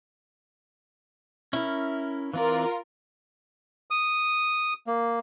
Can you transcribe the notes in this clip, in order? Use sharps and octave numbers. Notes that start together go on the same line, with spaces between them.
C#4 E4 A#4
E3 C4 F4 A#4 D5
D#6
A#3